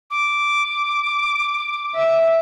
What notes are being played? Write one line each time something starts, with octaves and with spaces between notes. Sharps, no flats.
D6
E5